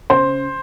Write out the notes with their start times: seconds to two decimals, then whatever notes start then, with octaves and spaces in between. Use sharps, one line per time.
0.10 C#3 C5